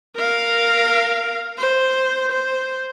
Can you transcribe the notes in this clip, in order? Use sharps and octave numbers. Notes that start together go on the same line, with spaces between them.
A#4 F5
C5
C5